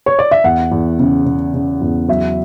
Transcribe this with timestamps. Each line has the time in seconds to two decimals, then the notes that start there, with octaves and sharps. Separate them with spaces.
0.06 C#5
0.19 D5
0.31 E5
0.44 E2 F#5
0.72 E2
0.99 C#3
1.26 C#3
1.54 C#3
1.81 E2
2.08 F#3 E5